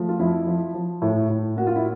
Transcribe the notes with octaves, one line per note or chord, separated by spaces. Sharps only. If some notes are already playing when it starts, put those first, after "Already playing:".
Already playing: F3 A3
F4
F2 E4
F3
F3
A2
A2
A#3 F#4
F4
E4